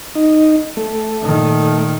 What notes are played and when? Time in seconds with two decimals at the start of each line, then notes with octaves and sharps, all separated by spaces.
0.15 D#4
0.77 A3
1.23 A#2 D#3